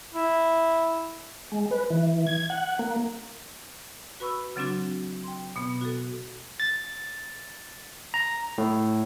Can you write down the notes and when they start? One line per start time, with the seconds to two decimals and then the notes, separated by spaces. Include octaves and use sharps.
0.14 E4
1.52 G#3
1.71 B4
1.90 E3
2.27 G#6
2.50 F#5
2.79 A#3
4.20 F#4 B4 B5 C#6 E6
4.56 C#3 F#3 C4 D4 F#4
5.24 G5 C6
5.56 B2 B3
5.81 F#4 A4
6.60 A6
8.14 A#5
8.58 A2